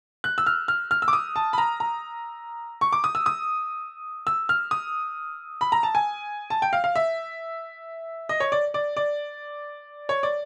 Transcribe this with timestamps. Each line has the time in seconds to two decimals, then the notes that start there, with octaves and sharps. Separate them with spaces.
0.24 F#6
0.38 E6
0.46 F6
0.68 F6
0.91 F6
1.02 E6
1.08 D6
1.13 D#6
1.36 A5
1.53 B5
1.58 A#5
1.80 A#5
2.81 C#6
2.93 D6
3.04 D#6
3.15 E6
3.26 D#6
4.27 E6
4.49 F6
4.71 D#6
5.61 B5
5.72 A#5
5.83 A5
5.95 G#5
6.50 A5
6.62 G5
6.73 F5
6.84 F5
6.96 E5
8.29 D#5
8.40 C#5
8.52 D5
8.74 D5
8.97 D5
10.09 C#5
10.23 D5